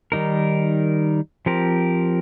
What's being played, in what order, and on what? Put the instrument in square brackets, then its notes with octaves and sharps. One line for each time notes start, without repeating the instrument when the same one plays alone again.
[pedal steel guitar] D#3 G3 D#4 A#4
F3 C4 G4 A#4